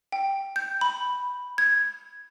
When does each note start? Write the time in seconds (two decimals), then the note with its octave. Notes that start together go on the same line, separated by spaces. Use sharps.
0.12 G5
0.56 G6
0.81 B5
1.58 G#6